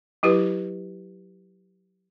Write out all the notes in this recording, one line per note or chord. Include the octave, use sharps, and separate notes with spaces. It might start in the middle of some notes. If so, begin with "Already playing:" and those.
F#3 E4 G4 B4